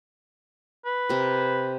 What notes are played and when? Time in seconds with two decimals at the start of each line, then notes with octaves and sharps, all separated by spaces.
0.86 B4
1.09 C3 A#4